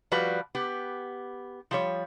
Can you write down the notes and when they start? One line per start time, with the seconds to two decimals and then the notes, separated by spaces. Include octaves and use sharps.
0.12 F3 G3 F#4 B4
0.55 B3 G4
1.71 F3 G3 C#5